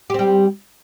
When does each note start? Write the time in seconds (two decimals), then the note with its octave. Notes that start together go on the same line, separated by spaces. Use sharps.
0.10 G4
0.14 C4
0.19 G3